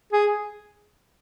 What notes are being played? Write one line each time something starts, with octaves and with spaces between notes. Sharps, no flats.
G#4